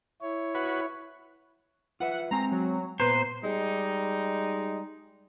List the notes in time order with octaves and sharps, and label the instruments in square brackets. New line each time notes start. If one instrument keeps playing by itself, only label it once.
[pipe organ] E4 C#5
[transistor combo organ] F#4 B4
[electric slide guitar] F4 B4 E5 [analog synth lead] F#5
[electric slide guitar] G#3 C4 G#5 [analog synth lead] A#5
[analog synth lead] F#3
[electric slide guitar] A#2 B3 A#5 [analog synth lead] B4 [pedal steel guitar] C5
[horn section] G3 G#3 D#4